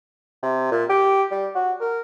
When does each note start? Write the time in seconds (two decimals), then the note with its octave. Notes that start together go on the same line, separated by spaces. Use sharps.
0.42 C3
0.71 A#2
0.90 G4
1.31 G3
1.55 F#4
1.81 A#4